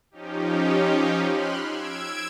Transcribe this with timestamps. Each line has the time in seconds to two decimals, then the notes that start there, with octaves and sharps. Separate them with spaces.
0.11 F3 C#4 D#4 G4
1.25 B5 C6 F6 F#6
1.64 E6 G#6 D7